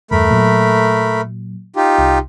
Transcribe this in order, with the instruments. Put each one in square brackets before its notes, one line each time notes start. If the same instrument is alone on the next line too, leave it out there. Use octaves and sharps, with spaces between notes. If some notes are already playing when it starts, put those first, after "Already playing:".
[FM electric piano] E2 G2 [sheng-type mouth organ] A3 A#4 B5
[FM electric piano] A#2 F#3
[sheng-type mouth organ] D#4 F4 G4
[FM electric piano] C2